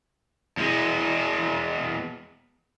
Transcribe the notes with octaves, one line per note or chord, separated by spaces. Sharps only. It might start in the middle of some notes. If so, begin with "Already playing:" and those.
E2 G#3